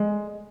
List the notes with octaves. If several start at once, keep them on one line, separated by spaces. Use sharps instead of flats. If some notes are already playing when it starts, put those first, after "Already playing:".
Already playing: G#3